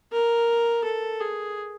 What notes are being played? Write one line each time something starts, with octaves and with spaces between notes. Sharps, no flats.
A#4
A4
G#4